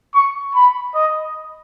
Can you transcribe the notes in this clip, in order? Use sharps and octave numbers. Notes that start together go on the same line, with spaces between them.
C#6
B5
D#5